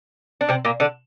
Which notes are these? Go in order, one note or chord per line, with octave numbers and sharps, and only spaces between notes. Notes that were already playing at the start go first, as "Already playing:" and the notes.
D4
C3 C4
A#2 A#3
D3 D4